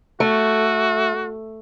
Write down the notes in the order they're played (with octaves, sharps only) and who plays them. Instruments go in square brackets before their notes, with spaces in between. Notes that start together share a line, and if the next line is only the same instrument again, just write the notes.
[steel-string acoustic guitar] A3 [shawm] F#4